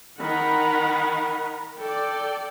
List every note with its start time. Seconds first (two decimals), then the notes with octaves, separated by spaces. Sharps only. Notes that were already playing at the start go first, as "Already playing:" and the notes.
0.19 D#3 A#4 F#5 B5
1.79 A4 D5 G5